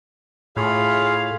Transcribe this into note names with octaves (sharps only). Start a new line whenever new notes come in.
A2 F4 G#4 C#5 F5 B5